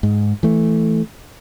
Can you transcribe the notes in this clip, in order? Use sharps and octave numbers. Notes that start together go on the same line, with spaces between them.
G#2
E3 A3